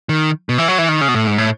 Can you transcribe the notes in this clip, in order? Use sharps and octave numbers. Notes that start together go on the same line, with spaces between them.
D#3
B2
E3
F#3
E3
D#3
C#3
B2
A2
G#2
A2